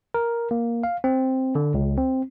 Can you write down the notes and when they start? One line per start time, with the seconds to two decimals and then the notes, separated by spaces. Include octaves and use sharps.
0.14 A#4
0.51 A#3
0.83 F5
1.04 C4
1.55 D3
1.74 C#2
1.98 C4